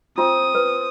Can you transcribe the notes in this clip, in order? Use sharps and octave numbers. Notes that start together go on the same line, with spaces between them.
C4 F4 D#6
B4